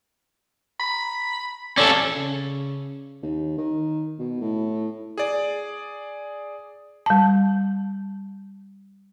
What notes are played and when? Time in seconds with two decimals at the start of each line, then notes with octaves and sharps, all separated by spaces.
0.80 B5
1.78 C#4 A4 D5
2.16 C#3
3.22 D#2
3.58 D#3
4.19 B2
4.41 A2
5.18 G#4 D5
7.06 G3 A5